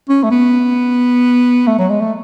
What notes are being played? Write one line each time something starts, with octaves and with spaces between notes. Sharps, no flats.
C#4
A3
B3
A3
F#3
G#3
A3